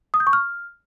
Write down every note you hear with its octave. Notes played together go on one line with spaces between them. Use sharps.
D#6
G6
C#6
F6